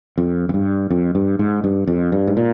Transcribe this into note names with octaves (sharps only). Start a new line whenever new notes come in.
F2
F2
G2
F2
G2
G#2
G2
F2
G2
G#2
A#2